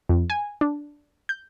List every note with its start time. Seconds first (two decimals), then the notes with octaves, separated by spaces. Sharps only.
0.09 F2
0.30 G#5
0.61 D4
1.29 G6